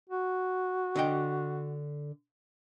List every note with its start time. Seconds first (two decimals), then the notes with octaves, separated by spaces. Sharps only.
0.10 F#4
0.96 D3 D#5 G5